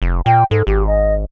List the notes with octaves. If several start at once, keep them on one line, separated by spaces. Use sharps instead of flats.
F1
A#2 G5
G#2 A4
G#1 G4
D#5